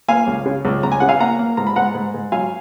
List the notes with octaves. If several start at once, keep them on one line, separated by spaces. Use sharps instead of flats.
A#3 F5 G#5
C#2
C#3
C#2
C#2 A#5
G#5
C#3 F#5
F5 G#5
A#3 F#5 A#5
A#3
G#2 A#5
B5
G#2 F#5 A#5
G#2
G#2
F#3 F5 G#5